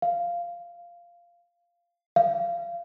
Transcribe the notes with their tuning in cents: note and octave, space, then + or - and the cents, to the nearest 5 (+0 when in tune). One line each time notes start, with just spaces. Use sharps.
F5 -10
F5 -25